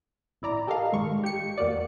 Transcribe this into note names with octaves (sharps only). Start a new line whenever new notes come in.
A1 E4 D5 A#5
G4 A4 A#4 D#5 F5
A1 G#2 D#3 G#3 C#6
G4 C#7
E2 A#3 F#4 D5